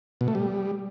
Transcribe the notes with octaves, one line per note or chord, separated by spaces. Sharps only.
B2
A3
G3